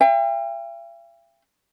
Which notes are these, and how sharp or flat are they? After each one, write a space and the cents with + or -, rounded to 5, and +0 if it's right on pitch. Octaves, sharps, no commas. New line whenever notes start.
E5 +45 G5 +35